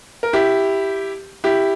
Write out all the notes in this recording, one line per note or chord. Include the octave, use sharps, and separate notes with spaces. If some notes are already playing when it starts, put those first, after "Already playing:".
A#4
E4 G4
E4 G4